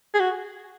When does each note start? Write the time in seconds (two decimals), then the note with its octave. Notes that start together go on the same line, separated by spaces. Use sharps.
0.14 G#4
0.20 F#4